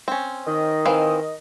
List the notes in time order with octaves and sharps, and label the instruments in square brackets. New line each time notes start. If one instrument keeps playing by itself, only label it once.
[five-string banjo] C4 C#4
[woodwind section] D#3 D#5
[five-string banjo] E3 C4 F5